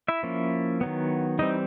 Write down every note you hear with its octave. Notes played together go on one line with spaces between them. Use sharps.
E4 E5
F3 A#3 C#4
D#3 F#3 B3
E3 G3 C4 D#4 D#5